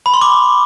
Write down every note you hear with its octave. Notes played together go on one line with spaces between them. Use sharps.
B5
C6
D6